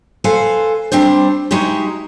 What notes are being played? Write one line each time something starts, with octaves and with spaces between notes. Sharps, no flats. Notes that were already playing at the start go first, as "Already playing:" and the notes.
A4 B4 C5 F5 G#5
G3 C4 D4 C5
G#3 D#4 E4 F#4 G4